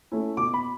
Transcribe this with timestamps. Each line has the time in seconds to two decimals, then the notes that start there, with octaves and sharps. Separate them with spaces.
0.12 A3 C#4 E4
0.37 B2 D6
0.54 B5